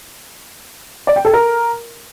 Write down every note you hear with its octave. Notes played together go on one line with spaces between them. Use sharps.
D5
G5
A4
A#4